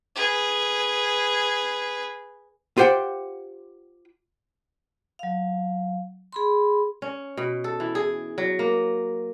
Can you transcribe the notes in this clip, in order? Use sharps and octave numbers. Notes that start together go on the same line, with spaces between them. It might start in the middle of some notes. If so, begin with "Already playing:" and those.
G#4 B4
F4 G4 C5 F#5 G5
F#3 F5
G#4 B5 C6
C#4
B2
A4
E3
G#4
F#3
A#3